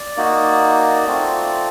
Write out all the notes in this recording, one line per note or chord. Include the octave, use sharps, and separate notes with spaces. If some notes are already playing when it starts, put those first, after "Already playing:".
Already playing: D5
A#3 D#4 F#4
A3 C4 F4